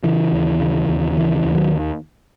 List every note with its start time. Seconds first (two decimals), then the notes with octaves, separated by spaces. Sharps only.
0.04 C#3 E3
0.33 D#2
0.60 C#3
0.89 D#2
1.17 C#3 E3
1.36 E3
1.45 D#2
1.55 D#3 F#3